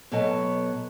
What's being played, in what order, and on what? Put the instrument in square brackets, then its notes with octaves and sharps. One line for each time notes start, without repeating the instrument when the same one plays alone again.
[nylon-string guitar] B2 F#3 B3 A4 D#5 A5